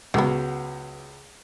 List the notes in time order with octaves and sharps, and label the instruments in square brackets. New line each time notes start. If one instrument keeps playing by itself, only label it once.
[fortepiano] C#2 G#3 [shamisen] F#3 B3